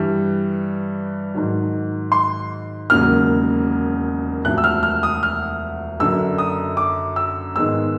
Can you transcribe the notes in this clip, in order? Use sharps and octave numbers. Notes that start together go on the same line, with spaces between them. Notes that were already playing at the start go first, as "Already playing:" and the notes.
Already playing: G2 E3 G3
G#2 D#3 F#3
C6
E1 D#2 C#3 F#3 A#3 F6
E1 D2 C3 F3 F#6
E6
F6
F6
D#6
F6
F#1 F#2 D3 E6
D#6
D6
E6
G#2 D#3 G#3 B3 E6